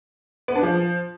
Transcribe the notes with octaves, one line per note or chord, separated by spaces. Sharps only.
B3
D4
F3